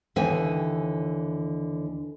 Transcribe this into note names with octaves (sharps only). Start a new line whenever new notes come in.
D#2 D3 E3 G5 G#5